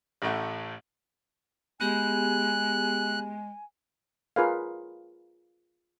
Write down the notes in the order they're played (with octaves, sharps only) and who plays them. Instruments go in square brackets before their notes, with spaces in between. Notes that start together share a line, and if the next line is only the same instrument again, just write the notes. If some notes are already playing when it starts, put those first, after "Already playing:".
[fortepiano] A1 A2 A3 F#5
[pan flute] G#3 [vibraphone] B3 G4 G#4 [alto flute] G#5 [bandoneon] F#6
[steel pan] F4 G#4 A#4 B4 C#5 F5